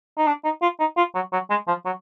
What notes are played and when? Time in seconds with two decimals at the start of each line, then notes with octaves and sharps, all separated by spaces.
0.18 D#4
0.27 D4
0.44 D#4
0.62 F4
0.80 D#4
0.97 F4
1.15 F#3
1.33 F#3
1.50 G#3
1.68 F3
1.85 F#3